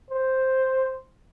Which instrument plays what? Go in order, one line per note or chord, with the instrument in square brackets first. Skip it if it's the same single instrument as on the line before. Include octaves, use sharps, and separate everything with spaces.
[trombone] C5